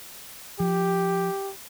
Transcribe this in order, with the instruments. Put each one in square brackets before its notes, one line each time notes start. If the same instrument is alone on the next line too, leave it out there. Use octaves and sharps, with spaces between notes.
[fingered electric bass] F3 [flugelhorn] G4